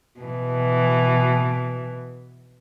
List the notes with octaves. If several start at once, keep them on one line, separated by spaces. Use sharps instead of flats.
B2 E3